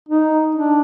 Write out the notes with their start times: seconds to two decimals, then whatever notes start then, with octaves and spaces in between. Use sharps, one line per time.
0.09 D#4
0.55 D4